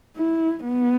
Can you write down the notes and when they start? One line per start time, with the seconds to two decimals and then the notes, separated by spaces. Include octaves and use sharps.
0.17 E4
0.65 B3